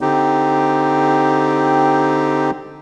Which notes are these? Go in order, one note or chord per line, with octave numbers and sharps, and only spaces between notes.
D3 C4 D#4 G4